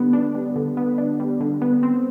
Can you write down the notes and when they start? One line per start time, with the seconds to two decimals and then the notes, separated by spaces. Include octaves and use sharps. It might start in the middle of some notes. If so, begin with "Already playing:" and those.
Already playing: D3 G3 B3 D4
0.13 D4
0.35 G3
0.56 D3
0.77 B3
0.98 D4
1.20 G3
1.40 D3
1.62 B3
1.83 C4